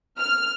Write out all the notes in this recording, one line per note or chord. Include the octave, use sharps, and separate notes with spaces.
F6